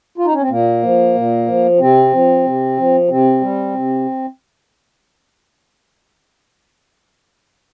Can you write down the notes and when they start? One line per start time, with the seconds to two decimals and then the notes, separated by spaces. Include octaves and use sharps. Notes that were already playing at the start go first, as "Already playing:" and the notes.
0.18 F4
0.25 D#4
0.34 C#4
0.41 C4
0.50 A#2 A#3
0.83 F3
1.15 A#2
1.47 F3
1.79 C3 C4
2.13 F3
2.45 C3
2.77 F3
3.09 C3 C4
3.41 G3
3.74 C3